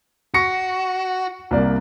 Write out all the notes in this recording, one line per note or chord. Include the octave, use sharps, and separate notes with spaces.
F#4 C#6 A#6 C#7
C2 A#3 D5